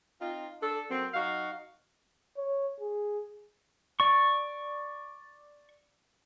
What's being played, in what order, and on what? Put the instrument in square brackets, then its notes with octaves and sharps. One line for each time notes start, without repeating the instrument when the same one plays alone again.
[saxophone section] C4 D#4 F4
D4 A4
F#3 A#3 C4
F#3 D#4 F#4 F5
[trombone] C#5
G#4
[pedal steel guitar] D5 C#6